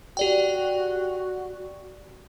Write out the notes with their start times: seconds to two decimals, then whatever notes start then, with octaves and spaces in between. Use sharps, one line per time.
0.17 F#4 G4 D5 G5